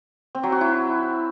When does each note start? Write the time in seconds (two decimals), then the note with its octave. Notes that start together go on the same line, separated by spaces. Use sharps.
0.35 C4
0.43 F#3
0.52 F#4
0.61 E4